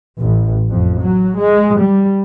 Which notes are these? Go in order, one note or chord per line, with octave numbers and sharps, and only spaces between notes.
A1
F2
F#3
G#3
G3